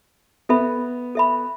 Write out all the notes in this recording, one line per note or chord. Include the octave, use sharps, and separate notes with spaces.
B3 A4 E5 B5
A4 E5 B5